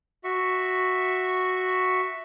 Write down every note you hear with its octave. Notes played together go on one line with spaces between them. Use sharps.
F#4 E5 C#6